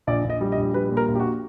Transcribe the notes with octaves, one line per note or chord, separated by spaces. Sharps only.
A#1 D5
A#1
D#5
G3
D#5
A#1
G3 B4
A#2
A#4
A#1
G4
F#4